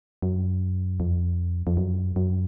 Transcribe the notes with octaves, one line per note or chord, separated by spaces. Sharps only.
F#2
F2
F2
F#2
F#2